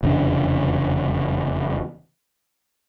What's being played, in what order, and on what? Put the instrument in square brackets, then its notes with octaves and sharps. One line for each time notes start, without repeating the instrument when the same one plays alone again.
[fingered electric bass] F1 E2 C#3 D4